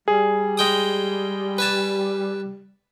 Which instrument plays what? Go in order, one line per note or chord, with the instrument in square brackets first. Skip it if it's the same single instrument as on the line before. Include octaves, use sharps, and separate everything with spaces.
[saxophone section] G3 [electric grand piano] G#4
[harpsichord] G#3 G5 D#6
B4 G#5 A5